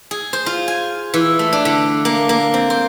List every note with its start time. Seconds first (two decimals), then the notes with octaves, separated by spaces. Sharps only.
0.11 G#4
0.33 C5
0.46 F4
0.68 G#5
1.14 E3
1.39 A3
1.53 D4
1.65 D3
2.05 A#3
2.29 A#3
2.54 C4
2.70 C5